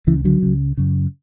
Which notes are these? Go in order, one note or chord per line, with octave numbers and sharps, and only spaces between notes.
C#2 C#3 E3
D3 F#3
C#2 C#3
F#2 C#3